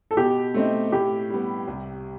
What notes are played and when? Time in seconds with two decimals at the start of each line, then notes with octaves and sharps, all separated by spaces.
0.11 A4
0.17 B2 G4
0.54 A3 C4 D#4
0.92 A2 G4
1.30 G3 B3
1.68 C2